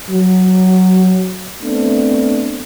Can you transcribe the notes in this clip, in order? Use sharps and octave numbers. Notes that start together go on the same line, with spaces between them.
F#3
A3 B3 C4 D4